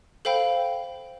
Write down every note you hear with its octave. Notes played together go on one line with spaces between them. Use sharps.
A4 C5 F5 G5 B5